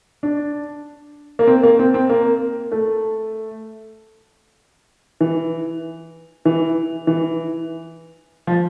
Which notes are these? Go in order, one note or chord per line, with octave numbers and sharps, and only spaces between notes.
D4
A#3
C4
A#3
C4
C4
A#3
A3
E3
E3
E3
F3